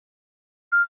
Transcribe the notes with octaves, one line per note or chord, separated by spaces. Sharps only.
F6